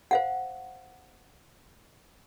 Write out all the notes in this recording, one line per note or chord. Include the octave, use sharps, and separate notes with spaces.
C5 F5 F#5